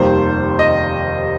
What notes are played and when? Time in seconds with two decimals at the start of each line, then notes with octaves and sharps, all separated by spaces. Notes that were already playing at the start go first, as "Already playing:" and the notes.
Already playing: F1 D#2 D#3 G3 C5
0.59 D#5